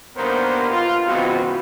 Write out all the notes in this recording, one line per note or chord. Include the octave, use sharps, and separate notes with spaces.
G2 D#3 A#3 B3 A#4 C5
F4
C#2 G#2 E3 B3 C4 F#4